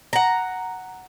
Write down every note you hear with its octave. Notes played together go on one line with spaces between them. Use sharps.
F#5 A#5